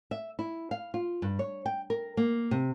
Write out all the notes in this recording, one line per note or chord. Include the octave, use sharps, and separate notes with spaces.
E5
E4
F5
F4
G2
C#5
G5
A#4
A#3
C3